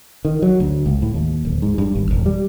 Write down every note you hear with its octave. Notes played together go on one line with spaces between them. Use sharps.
D#3
F#3
D2
C#2
A2
D#2
D1
G#2
G2
G#1
E1
G3